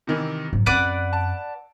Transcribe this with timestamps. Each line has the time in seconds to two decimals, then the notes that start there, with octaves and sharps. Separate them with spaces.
0.07 C3 D#3 E3
0.53 G#2 F#3
0.66 F#2 C4 B4 D5 F#5 D7
1.13 A5